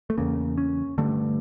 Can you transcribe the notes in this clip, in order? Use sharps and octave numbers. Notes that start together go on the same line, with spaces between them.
A3
E2 C#3 A#3
C#4
G2 D3 A3